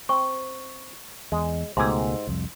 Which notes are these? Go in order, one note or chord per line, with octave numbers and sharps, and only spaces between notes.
C4 C#6
E2 G#3
C#2 G#2 B2 A3 G4 G#5 C6 E6
C2 F2